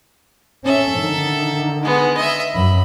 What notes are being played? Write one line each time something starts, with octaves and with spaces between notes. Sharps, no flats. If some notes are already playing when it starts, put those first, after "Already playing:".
C#4 A4 E5
D3 D#3
G#3 B3
D#5 E5
F#2 B5